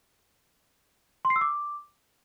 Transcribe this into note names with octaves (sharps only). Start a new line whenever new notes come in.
C6
C7
E6
D6